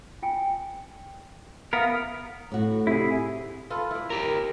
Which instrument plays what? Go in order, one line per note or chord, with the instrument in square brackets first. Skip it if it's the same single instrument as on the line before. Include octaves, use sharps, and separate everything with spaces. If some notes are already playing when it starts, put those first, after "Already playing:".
[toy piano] F4 G5 G#5
[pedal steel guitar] B3 A#4 [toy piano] E5 F5 D#6
[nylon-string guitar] A2 F#4
[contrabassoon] C3 [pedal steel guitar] E4 G#4
[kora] F4 A4 B4
E4 D5
[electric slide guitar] G4 A#4